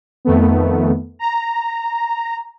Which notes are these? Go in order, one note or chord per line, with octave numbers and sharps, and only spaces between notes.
F2 D#3 A3 B3
A#5